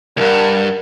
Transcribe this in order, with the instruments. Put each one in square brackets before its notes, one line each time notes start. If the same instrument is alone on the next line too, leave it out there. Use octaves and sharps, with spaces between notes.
[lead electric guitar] D2 G2 [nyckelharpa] A#4 F#5